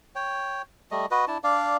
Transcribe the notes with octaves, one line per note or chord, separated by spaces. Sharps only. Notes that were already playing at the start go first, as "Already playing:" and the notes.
C#5 G5
G3 A3 D#5
F#4 B4 D#5
D4 E4 A5
D4 D5 F5